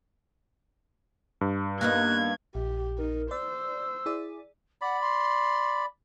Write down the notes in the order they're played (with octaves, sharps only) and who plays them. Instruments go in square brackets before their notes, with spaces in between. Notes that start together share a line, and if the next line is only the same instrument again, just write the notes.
[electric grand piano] G2
[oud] A#3 B3 D#4 [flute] F#6 [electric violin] G#6
[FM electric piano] A#1 [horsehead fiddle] G4
[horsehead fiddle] D#4 [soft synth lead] A#4
[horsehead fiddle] C5 [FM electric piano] D5 [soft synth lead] E6
[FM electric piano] E4 G#4 D5
[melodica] D5 B5 [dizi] F#5
[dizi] C6